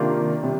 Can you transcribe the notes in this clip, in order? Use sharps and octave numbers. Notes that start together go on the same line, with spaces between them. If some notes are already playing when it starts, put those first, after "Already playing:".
Already playing: C3 D#3 A#3 D4 F4
C3 G3